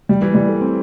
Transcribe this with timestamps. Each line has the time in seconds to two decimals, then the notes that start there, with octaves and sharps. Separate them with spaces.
0.09 G3
0.22 E3
0.35 G3
0.49 A3
0.61 C4